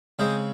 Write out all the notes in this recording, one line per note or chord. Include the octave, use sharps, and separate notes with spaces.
C#3 G#3 C4 C5 D#5